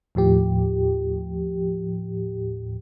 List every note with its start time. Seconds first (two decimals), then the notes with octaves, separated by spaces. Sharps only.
0.15 D#2 A2 F3 G4